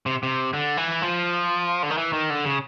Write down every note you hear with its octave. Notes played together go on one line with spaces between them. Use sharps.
C3
C3
D3
E3
F3
D3
D#3
E3
D#3
D3
C#3